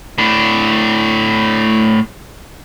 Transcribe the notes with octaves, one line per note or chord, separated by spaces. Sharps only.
A2 D4